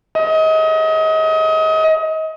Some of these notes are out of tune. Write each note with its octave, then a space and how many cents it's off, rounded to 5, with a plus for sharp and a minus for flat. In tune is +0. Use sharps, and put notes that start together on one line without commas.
D#5 +30